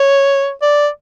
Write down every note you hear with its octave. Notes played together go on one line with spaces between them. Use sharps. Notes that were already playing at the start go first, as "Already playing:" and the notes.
Already playing: C#5
D5